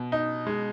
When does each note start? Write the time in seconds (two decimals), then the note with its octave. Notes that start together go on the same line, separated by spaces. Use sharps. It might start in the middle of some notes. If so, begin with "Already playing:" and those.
Already playing: B2
0.12 D#4
0.47 G#3